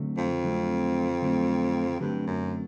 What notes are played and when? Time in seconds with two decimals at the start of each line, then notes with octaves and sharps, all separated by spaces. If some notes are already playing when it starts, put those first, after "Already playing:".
Already playing: D3 F#3 A3 C4
0.17 F2
0.43 D3 F#3 A3 C4
1.22 D3 F#3 A3 C4
2.00 G2 D3 F#3 A3 C4
2.27 F#2